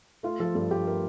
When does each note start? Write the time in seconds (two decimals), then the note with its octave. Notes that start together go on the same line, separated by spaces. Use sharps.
0.23 A3 F4
0.40 F3 A4
0.55 G2 A4
0.71 G2 G4
0.87 A3 A#4